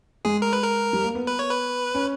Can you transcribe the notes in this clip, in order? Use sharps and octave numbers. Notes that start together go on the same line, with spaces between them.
G#3 G#4
A#4
B4
A#4
G3
A#3
B3
B4
C#5
B4
C#4